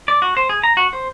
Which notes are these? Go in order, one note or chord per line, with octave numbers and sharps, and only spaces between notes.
D5
F#4
C5
G#4
A#5
F#4
C5